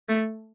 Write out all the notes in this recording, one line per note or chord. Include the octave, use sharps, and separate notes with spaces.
A3